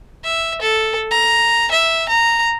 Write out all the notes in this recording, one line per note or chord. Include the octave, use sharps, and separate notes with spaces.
E5
A4
A#5
E5
A#5